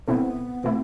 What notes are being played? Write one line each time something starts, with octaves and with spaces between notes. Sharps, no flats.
B2 A3 B3 C4 E4
B2 A3 C4 E4